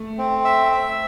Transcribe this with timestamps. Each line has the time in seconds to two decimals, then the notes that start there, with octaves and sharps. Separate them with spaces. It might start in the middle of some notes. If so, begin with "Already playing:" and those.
Already playing: A3
0.18 C4
0.45 E5
0.72 E5